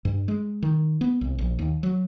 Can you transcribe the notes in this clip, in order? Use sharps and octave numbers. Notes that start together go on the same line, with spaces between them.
G2
G#3
D#3
B3
C2
A#1
D#2
F#3